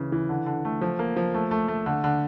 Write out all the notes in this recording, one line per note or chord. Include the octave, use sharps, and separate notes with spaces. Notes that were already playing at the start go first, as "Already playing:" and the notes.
Already playing: C#3 E3
E3
D3
D3
A3
F3
A#3
F3
A3
A3
A3
D3
D3